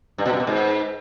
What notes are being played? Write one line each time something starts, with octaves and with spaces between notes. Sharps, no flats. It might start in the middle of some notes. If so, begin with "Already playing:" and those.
G2
B2
G2
B2
G#2